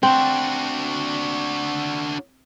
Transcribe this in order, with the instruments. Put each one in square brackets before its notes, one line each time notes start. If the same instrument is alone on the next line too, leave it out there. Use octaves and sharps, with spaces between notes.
[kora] C4 [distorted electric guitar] D4 F#4